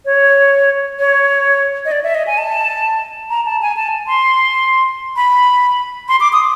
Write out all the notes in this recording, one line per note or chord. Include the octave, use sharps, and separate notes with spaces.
C#5
C#5
D#5
D5
E5
D#5
G#5
A5
A#5
A5
G#5
A5
C6
B5
C6
D6
D#6